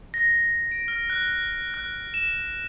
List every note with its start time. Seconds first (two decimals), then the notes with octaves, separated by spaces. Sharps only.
0.14 A#6
0.72 D7
0.88 F6
1.10 F#6
1.74 F#6
2.14 E7